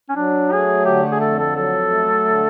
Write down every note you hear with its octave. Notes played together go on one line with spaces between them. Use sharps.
C#4
F#3 D4
A3 G#4
D3 G4
G#4
F2 A4
A4
F#3 A4
A3
D3